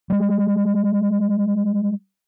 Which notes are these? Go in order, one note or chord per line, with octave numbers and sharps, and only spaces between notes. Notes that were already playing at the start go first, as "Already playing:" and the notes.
G3 G#3